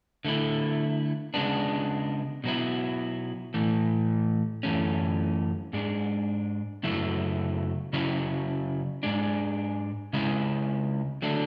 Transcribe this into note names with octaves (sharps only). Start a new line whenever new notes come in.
D3 A3 E4
C#3 G#3 B3 D4
B2 F#3 B3 E4
A2 E3 A3
F#2 E3 A3 C#4
G#2 G#3 D4
F#2 C#3 F#3 A3 E4
C#3 F#3 C#4 E4
G#2 G#3 D4
C#3 G#3 C#4 E4
D3 F#3 A3 D4